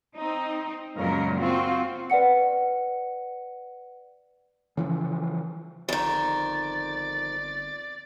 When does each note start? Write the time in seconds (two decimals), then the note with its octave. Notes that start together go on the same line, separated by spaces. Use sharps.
0.16 C4 D#4
0.97 F#2 A#2 C#3 F#3 G#3 A#4
1.38 C4 F4 F#4
2.10 B4 D5 F#5 C#7
4.77 C#3 E3 F3
5.89 G1 F2 D#3 D5